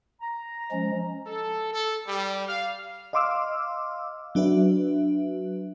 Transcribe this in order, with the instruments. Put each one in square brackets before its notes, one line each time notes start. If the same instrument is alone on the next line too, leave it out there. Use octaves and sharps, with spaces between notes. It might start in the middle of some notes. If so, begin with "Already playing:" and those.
[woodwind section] A#5
[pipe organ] F3 G#3 C#4
[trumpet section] A4
A4
G3
F5
[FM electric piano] D#5 F5 C6 D6 E6 F6
F#3 D4 F#4 B4 E5